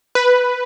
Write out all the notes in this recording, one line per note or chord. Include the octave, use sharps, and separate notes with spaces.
B4